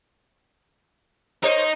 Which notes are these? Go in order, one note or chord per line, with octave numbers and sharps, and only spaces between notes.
D#4 A#4 C5 C#5